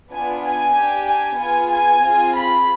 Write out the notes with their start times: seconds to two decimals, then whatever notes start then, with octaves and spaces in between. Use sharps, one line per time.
0.11 B3 D4 F4 G#5
0.43 G#5
0.74 D4 G4
1.07 G#5
1.39 B3 F4 G#4 G#5
1.70 G#5
2.03 C4 F4 G#4
2.35 B5